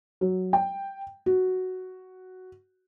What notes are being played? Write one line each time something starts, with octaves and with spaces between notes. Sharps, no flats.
F#3
G5
F#4